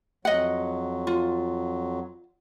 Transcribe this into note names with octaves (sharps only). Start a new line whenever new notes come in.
F2 F#3 D#5 F#5
F4